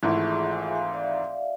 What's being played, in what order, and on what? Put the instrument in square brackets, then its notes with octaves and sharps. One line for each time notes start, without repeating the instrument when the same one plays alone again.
[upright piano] G#1 G#2 E3 A3 E4 [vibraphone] F4
[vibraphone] G#4
E5
E5
G#5
F5
F5
E5
D5
E5